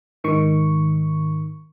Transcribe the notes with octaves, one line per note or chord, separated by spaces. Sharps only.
G#2 D#3 C#6